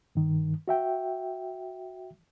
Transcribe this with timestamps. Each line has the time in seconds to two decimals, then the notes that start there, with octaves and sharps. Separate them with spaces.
0.15 G2 D#3
0.68 F#4 E5 G5